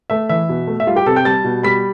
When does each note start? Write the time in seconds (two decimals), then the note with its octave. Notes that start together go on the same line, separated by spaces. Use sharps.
0.10 A3 E5
0.29 E3 E5
0.49 B2
0.67 A3
0.80 E5
0.87 G3 F4 F5
0.96 G4 G5
1.06 C3 A4 A5
1.16 G5 G6
1.25 G3 A5 A6
1.44 B2
1.63 G3 B5 B6